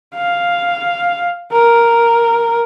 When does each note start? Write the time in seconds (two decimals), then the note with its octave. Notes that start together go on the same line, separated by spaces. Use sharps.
0.15 F5
1.53 A#4